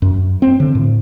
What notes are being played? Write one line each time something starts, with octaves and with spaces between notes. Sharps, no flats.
F#2
C4
D3
A2